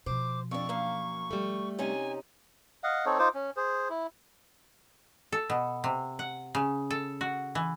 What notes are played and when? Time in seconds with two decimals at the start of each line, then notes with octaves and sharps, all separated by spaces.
0.06 B2 F3 C5 D6
0.51 F2 D4 C#6
0.69 F#2 A#3 F5
1.31 G3 A3
1.79 C3 C#4 D#4 G#5
2.83 D#5 F5 F#5
3.06 C4 D#4 A4 C#5
3.19 D#4 F4 C5 D6
3.34 C#4
3.57 G#4 C5
3.90 E4
5.32 A4
5.50 B2
5.84 C3
6.19 F#5
6.55 C#3
6.90 A4
7.21 F#4
7.55 E3